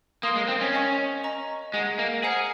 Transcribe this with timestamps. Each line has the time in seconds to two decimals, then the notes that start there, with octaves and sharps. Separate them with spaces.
0.23 A#3 A#4 F5 C6 D#6
0.36 G#3
0.48 C4
0.61 C#4
0.74 D#5 G#5 C#6
1.24 D#5 A#5 C#6
1.74 G#3 G#4 D#5 F#5 A#5
1.99 A#3
2.23 G#4 C5 F#5 A#5 F6